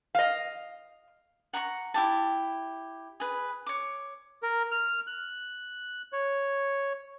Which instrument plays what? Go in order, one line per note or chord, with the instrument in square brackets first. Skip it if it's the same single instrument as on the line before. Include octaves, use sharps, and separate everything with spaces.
[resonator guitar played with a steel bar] D#5 F5
[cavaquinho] F#5 A#5 B5 C#6
E4 G4 A5
G#4 B4
C#5 D6
[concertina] A#4
F6
F#6
C#5